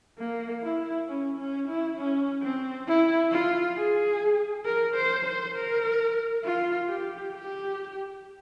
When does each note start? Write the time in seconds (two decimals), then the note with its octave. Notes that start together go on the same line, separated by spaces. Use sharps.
0.19 A#3
0.63 E4
1.08 C#4
1.38 C#4
1.68 E4
1.97 C#4
2.43 C4
2.87 E4
3.32 F4
3.76 G#4
4.65 A#4
4.95 C5
5.25 C5
5.55 A#4
6.44 F4
6.89 G4
7.34 G4